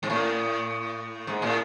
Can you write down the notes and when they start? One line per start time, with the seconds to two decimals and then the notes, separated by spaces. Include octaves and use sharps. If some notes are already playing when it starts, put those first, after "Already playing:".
0.03 G#2
0.10 A2
1.27 G#2
1.42 A2